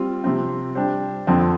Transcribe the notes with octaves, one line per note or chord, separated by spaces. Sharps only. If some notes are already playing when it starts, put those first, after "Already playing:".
Already playing: G3 C4 F4
C3 F3 C4
G3 D4 G4 C5
F2 D3 F3 C4